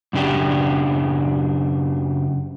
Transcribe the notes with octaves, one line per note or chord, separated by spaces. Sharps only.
F#2 C#3 D4 G4